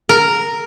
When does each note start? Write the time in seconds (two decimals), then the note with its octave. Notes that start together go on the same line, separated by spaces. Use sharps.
0.09 A#4